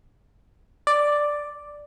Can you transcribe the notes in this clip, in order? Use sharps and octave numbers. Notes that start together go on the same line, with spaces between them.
D5